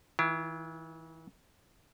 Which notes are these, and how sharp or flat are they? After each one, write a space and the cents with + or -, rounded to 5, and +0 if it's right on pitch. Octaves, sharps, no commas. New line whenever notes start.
E3 -35 E4 +40